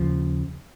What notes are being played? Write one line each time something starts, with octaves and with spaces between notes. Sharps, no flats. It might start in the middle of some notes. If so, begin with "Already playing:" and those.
Already playing: D#2 C#3 F3